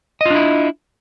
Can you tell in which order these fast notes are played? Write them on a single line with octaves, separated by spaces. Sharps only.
D#5 F4 D4 E4